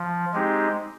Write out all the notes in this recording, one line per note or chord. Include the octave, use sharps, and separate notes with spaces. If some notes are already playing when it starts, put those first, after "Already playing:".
Already playing: F3
G#3 C4 D#4 G4